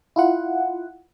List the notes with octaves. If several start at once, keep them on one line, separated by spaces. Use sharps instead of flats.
E4 F4 F#5